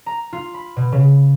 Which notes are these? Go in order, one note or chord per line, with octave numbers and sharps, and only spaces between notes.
A#5
F4
B5
B2
C#3